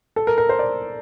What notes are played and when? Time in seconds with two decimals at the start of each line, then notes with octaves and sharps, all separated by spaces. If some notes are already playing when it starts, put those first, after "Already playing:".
0.16 A4
0.27 A#4
0.38 A#4
0.49 C5
0.59 D5